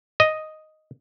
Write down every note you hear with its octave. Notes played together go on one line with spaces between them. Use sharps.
D#5